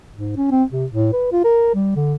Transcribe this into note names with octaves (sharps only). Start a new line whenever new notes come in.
G#2
C#4
C4
C3
A2
B4
F4
A#4
G3
D3